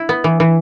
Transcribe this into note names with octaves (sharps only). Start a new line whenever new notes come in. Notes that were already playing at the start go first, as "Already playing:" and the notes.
Already playing: E4
B3
E3
E3